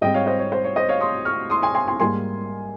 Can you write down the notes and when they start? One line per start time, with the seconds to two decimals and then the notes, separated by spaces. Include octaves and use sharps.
0.01 G#2 G3 C4 D#5 G5
0.14 C#5 F5
0.27 C5 D#5
0.39 C#5
0.52 C5
0.64 C#5
0.76 C5 D#5
0.89 C#5 F5
1.00 C6 D#6
1.25 C#6 F6
1.50 C6 D#6
1.62 G#5 C6
1.75 G#5 C6
1.88 G#5 C6
2.00 G#2 G3 A#3 G#5 C6